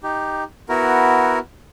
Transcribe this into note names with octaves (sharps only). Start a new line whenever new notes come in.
D#4 G4
B3 E4 F#4 A#4